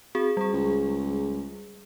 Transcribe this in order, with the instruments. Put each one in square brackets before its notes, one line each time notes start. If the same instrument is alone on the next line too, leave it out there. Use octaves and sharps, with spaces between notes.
[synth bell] C4 F#4 G#4
G3 G#4
[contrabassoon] C#2